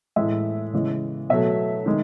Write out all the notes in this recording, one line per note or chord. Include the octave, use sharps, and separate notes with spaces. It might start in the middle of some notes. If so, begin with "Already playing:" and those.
A2 E3 G#3 E5
C#3 E3 G#3
B2 F#3 A3 E5
D#3 G#3